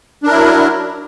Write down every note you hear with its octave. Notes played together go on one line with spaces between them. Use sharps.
F#3 D4 E4 A#4